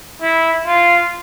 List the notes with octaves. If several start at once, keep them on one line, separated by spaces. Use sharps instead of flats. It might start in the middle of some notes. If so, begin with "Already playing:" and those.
E4
F4